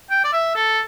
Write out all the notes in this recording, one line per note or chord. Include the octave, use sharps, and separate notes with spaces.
G5
D5
E5
A4